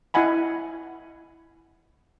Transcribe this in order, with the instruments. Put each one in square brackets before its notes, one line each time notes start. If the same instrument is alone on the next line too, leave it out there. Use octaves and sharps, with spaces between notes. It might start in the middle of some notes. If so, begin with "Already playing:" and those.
[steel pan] E4 D#5 F#5 G#5 B5